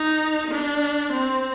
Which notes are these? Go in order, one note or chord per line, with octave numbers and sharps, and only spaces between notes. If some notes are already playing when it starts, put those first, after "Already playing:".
Already playing: D#4
D4
C4